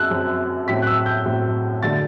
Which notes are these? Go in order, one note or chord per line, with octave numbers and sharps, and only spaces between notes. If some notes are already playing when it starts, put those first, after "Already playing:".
Already playing: F#2 F#3 C4 E6 F#6
F#2 F#3 C4
A2 F#3 C4 B6
F#6
E6
G6
A2 F#3 C4
D3 F#3 A3 D4 A6